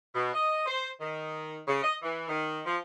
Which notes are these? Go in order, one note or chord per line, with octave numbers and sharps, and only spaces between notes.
B2
D#5
C5
D#3
C#3
D#5
E3
D#3
F3